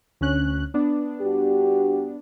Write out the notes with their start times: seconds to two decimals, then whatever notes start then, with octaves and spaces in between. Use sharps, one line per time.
0.21 D2 C#4 F#6
0.74 B3 D4
1.21 G2 F#4 G4